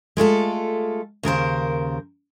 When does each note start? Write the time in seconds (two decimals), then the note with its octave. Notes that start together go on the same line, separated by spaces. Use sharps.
0.17 G#3 A3 F4 A4
1.23 D#2 C#3 A#4 C5